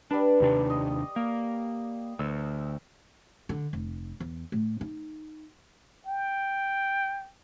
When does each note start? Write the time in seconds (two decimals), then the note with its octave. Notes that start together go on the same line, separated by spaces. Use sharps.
0.11 G3 D4 B4
0.40 D#2 C3 D4
0.67 D#5 C6
1.16 A#3
2.19 D2 E6
3.49 D3
3.73 F1
4.20 E2
4.52 A2
4.81 D#4
6.07 G5